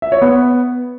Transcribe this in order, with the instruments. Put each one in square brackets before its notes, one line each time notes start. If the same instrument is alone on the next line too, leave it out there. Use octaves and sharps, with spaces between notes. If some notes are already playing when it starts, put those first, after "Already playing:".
[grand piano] E5
C#5
B3